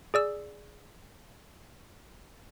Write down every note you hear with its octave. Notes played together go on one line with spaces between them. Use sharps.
G#4 D5 E6